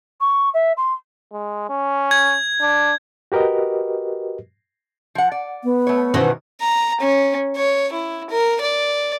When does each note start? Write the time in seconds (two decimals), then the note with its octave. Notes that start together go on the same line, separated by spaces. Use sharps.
0.21 C#6
0.54 E5
0.77 C6
1.32 G#3
1.70 C#4
2.11 G#6
2.61 D4
3.32 F#4 G4 A#4 B4 D#5
5.15 F3 F#5
5.32 D5
5.64 B3
5.87 A3 C#5
6.14 B2 D#3 E3 C#4 F#4 F#5
6.61 A#5
7.01 C#4
7.56 C#5
7.93 E4
8.30 A#4
8.61 D5